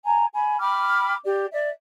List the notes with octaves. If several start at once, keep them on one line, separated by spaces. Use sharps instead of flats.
G#5 A#5
G#5 B5
G5 B5 D6 F6
G4 D5
D5 E5